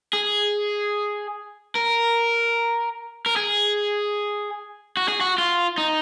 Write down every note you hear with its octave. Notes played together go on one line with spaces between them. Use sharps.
G#4
A#4
A#4
G#4
F#4
G#4
F#4
F4
D#4